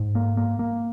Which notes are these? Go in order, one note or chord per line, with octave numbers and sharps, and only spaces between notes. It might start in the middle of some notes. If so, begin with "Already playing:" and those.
Already playing: G#2
A#3
A#3
A#3